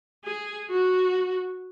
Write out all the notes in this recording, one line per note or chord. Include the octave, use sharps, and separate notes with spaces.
G#4
F#4